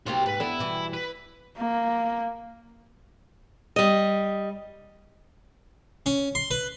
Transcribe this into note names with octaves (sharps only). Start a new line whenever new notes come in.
C3 A#3 F#4 G4 C6
G#2 B4
B3 D4 E4 A4
B2 E3 G3
B4
A#3
G3 D#5
C#4
C6
B4